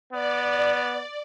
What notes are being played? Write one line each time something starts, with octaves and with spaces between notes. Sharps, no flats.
B3 D5